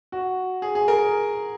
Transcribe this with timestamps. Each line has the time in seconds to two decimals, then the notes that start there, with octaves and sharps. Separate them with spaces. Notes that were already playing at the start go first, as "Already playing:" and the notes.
0.12 F#4
0.62 G#4
0.75 G#4
0.88 A#4